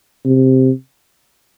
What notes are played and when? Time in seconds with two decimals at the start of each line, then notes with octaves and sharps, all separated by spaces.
0.25 C3